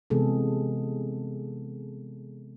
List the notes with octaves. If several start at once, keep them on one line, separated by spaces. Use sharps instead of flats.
C3 E3 G#3 B3 G#4 A4